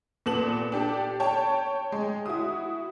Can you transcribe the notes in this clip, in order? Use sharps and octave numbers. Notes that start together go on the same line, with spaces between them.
A#2 B3 A4 E7 F#7
D4 G4 A4
C#5 G5 A5
G#3
E4 F#4 D#6